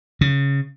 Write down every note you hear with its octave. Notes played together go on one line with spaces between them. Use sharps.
C#3